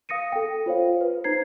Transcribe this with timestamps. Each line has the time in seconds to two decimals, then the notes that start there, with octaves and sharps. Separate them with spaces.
0.09 F5 D#6 A#6 C#7 D#7
0.32 A4 G5
0.66 F4 C5 C#5 F5
1.01 B4
1.24 D#4 C5 A#5 G#6 C7